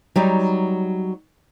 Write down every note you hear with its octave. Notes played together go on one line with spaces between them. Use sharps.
F#3 G3 D#4